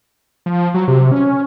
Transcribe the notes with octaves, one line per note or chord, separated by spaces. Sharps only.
F3
F#3
C3
C#4